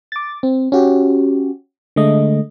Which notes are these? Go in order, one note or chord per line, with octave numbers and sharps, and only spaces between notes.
D6 A6
C4
C#4 F#4 G4
D3 G#3 A3 D#5